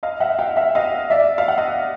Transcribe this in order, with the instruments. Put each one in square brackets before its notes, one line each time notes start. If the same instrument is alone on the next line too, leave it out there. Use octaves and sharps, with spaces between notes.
[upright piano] D#5 F5
E5 F#5
F5 G5
E5 F#5
D#5 F5
D5 E5
F5
F#5
D#5 F5